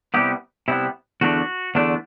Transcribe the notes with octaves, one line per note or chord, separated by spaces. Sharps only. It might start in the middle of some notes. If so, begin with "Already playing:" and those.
C3 G3 B3 E4 G4
C3 G3 B3 E4
E2 D3 A3 D4 F#4
E2 D3 A3 D4